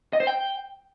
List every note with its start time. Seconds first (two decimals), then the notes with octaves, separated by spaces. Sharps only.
0.13 D#5
0.20 C5
0.27 G5